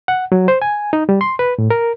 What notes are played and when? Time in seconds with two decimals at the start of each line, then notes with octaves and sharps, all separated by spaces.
0.08 F#5
0.32 F#3
0.48 C5
0.62 G#5
0.93 D#4
1.09 G3
1.21 C6
1.39 B4
1.58 A2
1.70 A#4